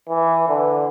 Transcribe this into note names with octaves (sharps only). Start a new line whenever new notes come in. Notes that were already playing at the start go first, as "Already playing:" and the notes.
E3
D3